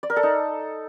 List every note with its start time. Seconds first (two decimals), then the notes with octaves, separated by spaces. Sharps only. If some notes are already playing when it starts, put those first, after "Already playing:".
0.03 D5
0.10 A#4
0.16 A4
0.23 D#4